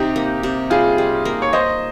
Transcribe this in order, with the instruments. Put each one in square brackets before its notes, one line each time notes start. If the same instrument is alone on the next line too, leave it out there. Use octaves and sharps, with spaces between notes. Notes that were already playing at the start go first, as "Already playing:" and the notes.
Already playing: [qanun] C3 [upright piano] D#4 G4
[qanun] A#3
C3
[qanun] G3 [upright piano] F4 G#4
[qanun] G3
A#3
[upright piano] C#5
[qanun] A#3 [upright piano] C5 D#5